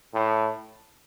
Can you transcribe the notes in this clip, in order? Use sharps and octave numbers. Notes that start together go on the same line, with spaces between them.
A2